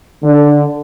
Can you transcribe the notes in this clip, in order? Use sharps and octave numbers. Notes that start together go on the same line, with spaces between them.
D3 D4